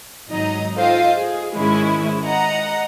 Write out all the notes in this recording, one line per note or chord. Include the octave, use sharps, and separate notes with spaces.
G#1 F#3 D#4 D#5 A#5
F4 A4 C5 D#5 F5 G5
G#4
G#2 D#3 G#3 C#4 E4
D#5 F#5 A#5